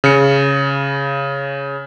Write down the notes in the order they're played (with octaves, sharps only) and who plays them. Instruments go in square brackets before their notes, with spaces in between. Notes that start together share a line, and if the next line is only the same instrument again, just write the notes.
[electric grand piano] C#3 C#7